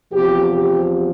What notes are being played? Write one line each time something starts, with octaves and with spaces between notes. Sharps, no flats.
E2 C3 F3 G4
G4